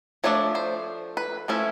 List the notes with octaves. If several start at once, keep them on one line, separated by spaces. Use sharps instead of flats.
F3 A3 D4 C#5
C5
B4
F3 A3 C#4 E4